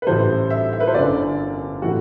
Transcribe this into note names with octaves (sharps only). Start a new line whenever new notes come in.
B4
A1 A2 E3 G3 C5
E5
E5
B4
C5
G1 F#2 D3 D5
A2 E3 G3 F#4